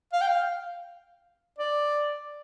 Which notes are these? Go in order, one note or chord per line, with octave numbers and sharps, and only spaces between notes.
F5
G5
F5
D5